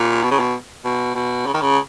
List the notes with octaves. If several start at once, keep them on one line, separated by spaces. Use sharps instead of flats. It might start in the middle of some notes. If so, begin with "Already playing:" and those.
Already playing: A#2
B2
C#3
B2
B2
B2
C#3
D#3
C#3